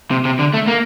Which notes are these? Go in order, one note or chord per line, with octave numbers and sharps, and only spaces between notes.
C3
C3
D3
A3
A#3